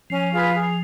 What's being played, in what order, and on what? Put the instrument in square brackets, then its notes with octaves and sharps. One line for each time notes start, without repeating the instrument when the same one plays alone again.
[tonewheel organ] F3 [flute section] C#4
[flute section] F4 G#4 B4
G#4